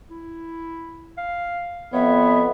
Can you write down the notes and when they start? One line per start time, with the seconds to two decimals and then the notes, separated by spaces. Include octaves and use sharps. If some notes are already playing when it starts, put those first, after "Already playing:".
0.10 E4
1.18 F5
1.93 F2 B3 C#5 E5